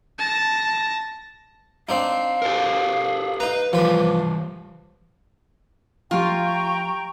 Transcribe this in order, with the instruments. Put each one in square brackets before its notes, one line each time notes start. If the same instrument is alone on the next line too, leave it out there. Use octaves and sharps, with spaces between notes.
[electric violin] A5 A#6
[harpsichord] C4 D4 D#4 [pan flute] F5
[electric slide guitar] G4 A4 A#4
[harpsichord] D#4 A#5 [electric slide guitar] B4
[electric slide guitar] E3 G3 [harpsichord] F3 B4
[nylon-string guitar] F3 A3 G4 [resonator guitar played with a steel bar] F4 [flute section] G5 A#5 C#6